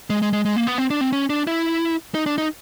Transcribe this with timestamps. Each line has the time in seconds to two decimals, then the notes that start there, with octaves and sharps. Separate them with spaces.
0.10 G#3
0.22 G#3
0.33 G#3
0.45 G#3
0.56 A#3
0.67 B3
0.78 C4
0.90 D4
1.01 C4
1.12 C#4
1.30 D4
1.47 E4
2.15 D#4
2.26 D4
2.38 D#4